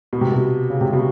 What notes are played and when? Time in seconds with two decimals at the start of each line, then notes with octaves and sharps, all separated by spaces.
0.13 B2
0.21 C3
0.32 B2
0.70 C#3
0.81 C3
0.93 B2